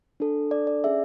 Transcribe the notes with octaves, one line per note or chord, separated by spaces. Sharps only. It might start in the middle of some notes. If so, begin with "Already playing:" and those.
D4 A4
D5
D5
C#4 G#4 E5